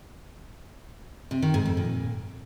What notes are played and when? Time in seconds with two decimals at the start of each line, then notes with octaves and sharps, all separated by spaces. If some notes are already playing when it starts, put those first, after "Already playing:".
1.31 C3
1.42 D#3
1.54 G#2
1.65 F2
1.77 A#2